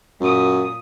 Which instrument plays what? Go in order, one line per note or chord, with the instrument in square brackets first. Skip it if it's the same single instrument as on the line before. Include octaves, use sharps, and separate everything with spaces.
[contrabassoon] F#2 [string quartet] A#2 D#6